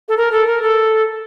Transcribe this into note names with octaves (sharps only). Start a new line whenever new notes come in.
A4
A#4
A4
A#4
A4